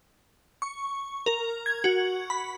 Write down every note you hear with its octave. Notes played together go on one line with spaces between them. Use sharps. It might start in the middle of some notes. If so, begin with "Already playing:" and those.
C#6
A#4
G#6
F#4
B5